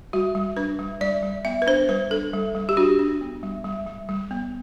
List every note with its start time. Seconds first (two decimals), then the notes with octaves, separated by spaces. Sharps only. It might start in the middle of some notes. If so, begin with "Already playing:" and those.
0.13 G3 F#4
0.35 G3
0.57 D4 B4
0.79 G3
1.01 G3 D5
1.23 G3
1.45 B3 E5
1.62 B4
1.67 D4 C5
1.89 G3 B4
2.11 D4 A4
2.33 G3
2.55 G3
2.69 G4
2.77 D4 F#4
2.99 D4
3.21 B3
3.43 G3
3.64 G3
3.86 G3
4.09 G3
4.31 B3